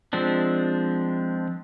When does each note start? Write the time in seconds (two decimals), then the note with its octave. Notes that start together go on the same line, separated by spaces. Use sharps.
0.13 F3 G#3 C4 D4